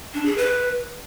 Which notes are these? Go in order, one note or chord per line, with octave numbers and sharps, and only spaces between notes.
D4
G#4
B4